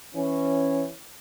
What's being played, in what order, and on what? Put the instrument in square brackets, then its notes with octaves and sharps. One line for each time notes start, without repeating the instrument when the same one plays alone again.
[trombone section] E3 C#4